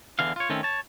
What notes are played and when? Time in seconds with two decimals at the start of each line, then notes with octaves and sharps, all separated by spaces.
0.19 E2 D3 E3 F5
0.36 F4 C#5
0.50 D#3 A3 C4 C#4
0.63 C#5 A5